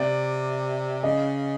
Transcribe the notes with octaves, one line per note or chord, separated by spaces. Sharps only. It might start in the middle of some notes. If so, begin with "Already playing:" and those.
Already playing: C3 D5
C#3 D#5